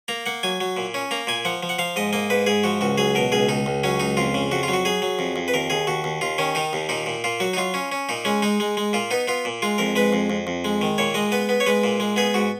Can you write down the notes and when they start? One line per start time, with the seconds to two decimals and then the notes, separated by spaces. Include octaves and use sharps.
0.08 A#3 A#5
0.26 A#3 F#5
0.43 F#3 G#5
0.61 F#3
0.77 A#2
0.94 C#4
1.11 A#3 A#5
1.27 A#2 G#5
1.45 F3 F#5
1.63 F3
1.69 F#5
1.79 F3 F5
1.96 G#2 D#5
2.13 A#3 D#5
2.30 G#2 B4
2.47 G#2 G#4
2.64 F3 F#4
2.81 C#2 F#4
2.98 F#3 G#4
3.15 B2 A#4
3.32 C#2 G#4
3.49 C#2 D#4
3.66 C#2
3.84 F#3 C#4
4.00 C#2 D#4
4.17 F2 F4
4.34 C#3
4.51 F2 F#4
4.63 F4
4.68 F#3
4.73 F#4
4.85 F#3 G#4
5.02 F#3
5.19 F2
5.36 F2
5.48 B4
5.54 D#2 A#4
5.70 D#2 G#4
5.87 D#2 F#4
6.04 D#2
6.21 D#2 F4
6.38 D#3 C#4
6.55 D#3 D#4
6.73 D#2
6.89 A#2 D#4
7.06 A#2
7.24 A#2 F4
7.40 F#3 F#4
7.53 D#4
7.57 F#3 F4
7.74 C#4
7.92 C#4
8.09 A#2 D#4
8.25 G#3 C#4
8.42 G#3 D#4
8.60 G#3
8.77 G#3
8.93 A#2 F4
9.11 B3 D#4
9.28 B3 F4
9.45 A#2
9.62 G#3 F4
9.78 F2 A#4
9.96 G#3 B4
10.13 F2
10.30 F2
10.47 F2
10.64 G#3
10.81 D#3
10.98 A#2 C#5
11.14 G#3 D#5
11.32 B3 B4
11.49 B3
11.60 C#5
11.67 G#3 B4
11.84 A#2
12.00 G#3
12.16 B3 G#4
12.34 G#2 F#4